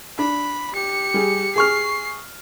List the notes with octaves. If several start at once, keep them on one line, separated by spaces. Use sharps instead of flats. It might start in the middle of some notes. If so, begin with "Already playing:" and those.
D4 B5
G4 C#7
G3 G#4
G#4 C#6 F6 C7